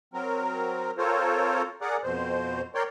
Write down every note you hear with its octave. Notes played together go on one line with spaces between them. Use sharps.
F#3 C4 A#4
C4 F4 A4 A#4 C5 C#5
G#4 A#4 D5 F#5
F2 B2 C5
A#4 C#5 D5 G5 C6